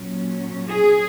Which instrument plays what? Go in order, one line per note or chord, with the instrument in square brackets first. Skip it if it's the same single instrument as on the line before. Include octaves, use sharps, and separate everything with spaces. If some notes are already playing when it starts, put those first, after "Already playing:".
Already playing: [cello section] A#2 F#3 C#4
G#4